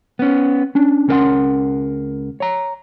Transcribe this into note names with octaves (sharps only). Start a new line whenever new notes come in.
B3 C#4
C#4 D4
C#2 C#4 A#4 B4 F#5 C6
C#5 A#5